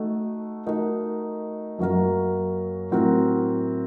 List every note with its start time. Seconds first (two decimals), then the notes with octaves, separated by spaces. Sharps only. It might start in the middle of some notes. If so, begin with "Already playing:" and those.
Already playing: A3 D#4 F#4
0.66 A3 D#4 F#4 A#4 D#5
1.79 F#2 F#3 A#3 F#4 A#4
2.91 A2 F#3 C4 F#4 A#4